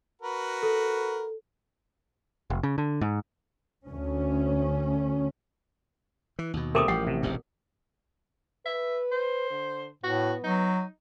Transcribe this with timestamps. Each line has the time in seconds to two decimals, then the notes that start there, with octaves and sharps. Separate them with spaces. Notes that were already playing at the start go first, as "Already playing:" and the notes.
0.22 F#4 A#4 B4
0.63 A4
2.50 F1
2.63 C#3
2.78 D3
3.01 G#2
3.86 D2 C#4
6.39 E3
6.53 D#2 B2
6.75 C3 A3 C4 A#4 D6 D#6
6.88 A1 F3 G4 F#5
7.07 C3
7.22 E1 A1 G2
8.66 B4 E5
9.12 C5
9.51 D3
10.04 A2 B3 F#4
10.44 F#3 D#4